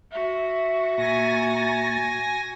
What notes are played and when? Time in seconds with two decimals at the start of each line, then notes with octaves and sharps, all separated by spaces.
0.12 F#4 E5
0.98 A#2 G#5 A#5 A6 A#6